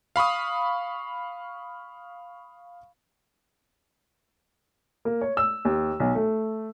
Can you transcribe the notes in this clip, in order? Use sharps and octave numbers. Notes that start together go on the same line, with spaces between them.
F5 B5 C#6 D#6
A#3
C#5
E6
D#2
B1
A3